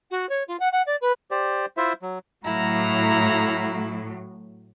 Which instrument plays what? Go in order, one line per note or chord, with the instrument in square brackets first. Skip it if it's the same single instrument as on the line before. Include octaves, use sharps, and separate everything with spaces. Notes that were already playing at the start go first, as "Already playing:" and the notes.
[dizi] F#4
C#5
F4
F#5
F#5
D5
B4
[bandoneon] G4 C5 D5
E4 F4 C5 E5
F#3
[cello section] A2 F#3 [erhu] E4 [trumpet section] F5 F#5 A#5